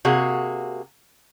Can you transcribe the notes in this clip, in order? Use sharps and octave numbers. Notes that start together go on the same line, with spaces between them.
C3 A#3 F#4 G#4